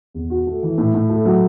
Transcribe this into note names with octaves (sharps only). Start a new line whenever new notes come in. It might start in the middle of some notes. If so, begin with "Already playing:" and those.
E2
F#4
A3
E3
A2
A2
A3
F#3